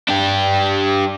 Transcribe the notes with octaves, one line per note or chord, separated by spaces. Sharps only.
D4 G4